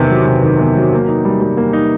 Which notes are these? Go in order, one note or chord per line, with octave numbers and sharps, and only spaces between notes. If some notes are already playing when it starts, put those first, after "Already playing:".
Already playing: E2 C3 D#3
F#3
C3
D#3
E2
F#3
A#3
D#4
G3
G3
A#3
D#4